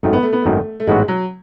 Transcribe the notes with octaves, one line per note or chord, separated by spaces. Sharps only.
G#1 F#2 D#3 A3
B3
A3
B3
G#1 F#2 D#3 A3
A3
A1 G#2 F#3 G#3 B3 F#4
F#3